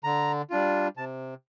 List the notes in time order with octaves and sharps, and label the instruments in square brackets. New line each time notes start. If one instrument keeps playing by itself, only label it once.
[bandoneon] D3 A#5
G3 D4 F4
C3 A5